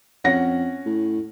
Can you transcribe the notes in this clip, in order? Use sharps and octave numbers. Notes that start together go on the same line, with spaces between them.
F2 C#4 F#5 A#6
A2